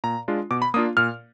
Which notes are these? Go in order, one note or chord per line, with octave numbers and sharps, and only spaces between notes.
A#2 A#5
G#3 D4 F4
B2 D6
B5
A#3 D4 F4 D#6
A#2 F6